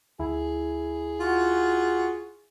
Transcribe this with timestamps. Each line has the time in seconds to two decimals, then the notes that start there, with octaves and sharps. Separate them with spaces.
0.19 D2 E4 G#4
1.20 F4 F#4